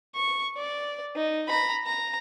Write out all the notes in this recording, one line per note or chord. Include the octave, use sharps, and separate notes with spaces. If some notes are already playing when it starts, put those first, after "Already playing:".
C#6
D5
D#4
A#5 B5
A#5